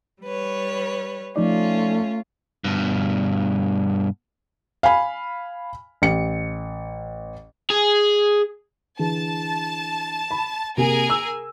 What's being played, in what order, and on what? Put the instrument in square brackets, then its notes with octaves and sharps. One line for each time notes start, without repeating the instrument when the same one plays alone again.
[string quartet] G3 B4 C#5
[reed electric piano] F3 D#4 D5 [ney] A3 [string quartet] C#4 F4
[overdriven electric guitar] G2 B2
[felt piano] F5 G#5 B5
A1 C#7
[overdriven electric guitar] G#4
[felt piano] D3 E3 G#4 [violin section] A5
[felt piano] B5
[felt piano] C3 A#3 [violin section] G#4 A#4 G#5
[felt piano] E6